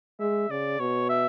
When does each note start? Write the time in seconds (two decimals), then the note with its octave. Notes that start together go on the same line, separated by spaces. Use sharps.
0.20 G#3 E5
0.50 C#3 D5
0.79 B2 C#5
1.09 E5